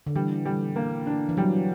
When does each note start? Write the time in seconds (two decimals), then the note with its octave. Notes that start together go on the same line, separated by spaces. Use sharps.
0.06 D3
0.15 E3 G3
0.45 G3
0.76 A#3
1.07 D4
1.29 E3
1.37 F#3 G3